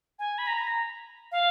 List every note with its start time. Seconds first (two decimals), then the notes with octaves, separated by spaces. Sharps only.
0.19 G#5
0.38 B5
0.47 A#5
1.32 F5